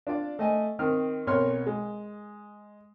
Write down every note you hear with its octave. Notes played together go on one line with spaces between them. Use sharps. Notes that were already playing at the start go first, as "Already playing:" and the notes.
D4 F4 D5
A3 D#5 G#5
D#3 C4 F6
B1 F2 A#4 C#5 C6 F6
G#3